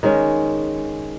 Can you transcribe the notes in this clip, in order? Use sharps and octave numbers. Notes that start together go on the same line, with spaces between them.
D#3 G#3 C#4